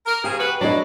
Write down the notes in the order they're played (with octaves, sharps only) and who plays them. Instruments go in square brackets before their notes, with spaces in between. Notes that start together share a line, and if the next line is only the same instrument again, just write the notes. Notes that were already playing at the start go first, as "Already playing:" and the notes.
[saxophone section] A#4
[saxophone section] C#3 F3 G#4 [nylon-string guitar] G4
[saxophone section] B3 F#4 B4
[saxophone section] E3 D4 [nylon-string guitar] F#3 D#5